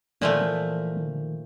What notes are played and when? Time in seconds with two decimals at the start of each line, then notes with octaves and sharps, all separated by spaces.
0.21 A#2 E3 F3 A3
0.31 D#3
0.41 E3
0.97 D#3
1.08 D3
1.22 D#3